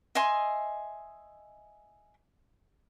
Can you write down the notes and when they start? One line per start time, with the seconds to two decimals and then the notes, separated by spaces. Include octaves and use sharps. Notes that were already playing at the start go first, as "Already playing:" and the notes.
0.15 D#5 E5 G#5 C6